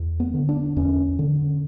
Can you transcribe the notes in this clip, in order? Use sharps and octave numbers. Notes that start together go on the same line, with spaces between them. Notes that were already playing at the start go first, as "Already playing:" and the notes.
Already playing: E2
B3
D3
D4
E2 C#4
D3